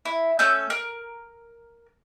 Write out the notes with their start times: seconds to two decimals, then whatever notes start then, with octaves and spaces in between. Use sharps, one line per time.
0.05 E4
0.39 A3 C#4 E6 G6
0.70 A#4